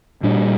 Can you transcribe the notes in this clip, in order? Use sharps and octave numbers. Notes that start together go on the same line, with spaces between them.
A#2 G3 D4